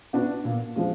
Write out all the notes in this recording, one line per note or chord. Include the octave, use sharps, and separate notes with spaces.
B3 D4 F#4
A#2
F3 G#3 D4 F4